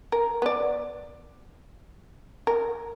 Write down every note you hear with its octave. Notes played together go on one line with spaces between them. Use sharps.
A#4
B3 D5
A#4